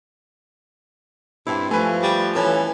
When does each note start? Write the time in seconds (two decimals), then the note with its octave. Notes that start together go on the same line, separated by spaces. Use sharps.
1.47 G2 C4 D4 E4
1.71 F3 A3 B4 G#5
2.02 G3
2.35 E3 C#4 A4